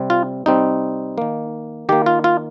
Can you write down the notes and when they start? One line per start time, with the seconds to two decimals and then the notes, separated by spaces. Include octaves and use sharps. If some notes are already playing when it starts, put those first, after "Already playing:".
Already playing: C3 G3 C4
0.10 F4
0.46 C3 G3 C4 D#4
1.18 D#3 A#3
1.89 D#3 A#3 G4
2.06 F4
2.24 F4